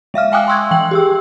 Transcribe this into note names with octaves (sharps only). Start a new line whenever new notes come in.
G#3 E5 F5 F6
F5 G5 G#5 D6 D#6 F#6
G5 C6 C#6 E6 F#6 G#6
E3 G5 F#7
G4 G#4 E6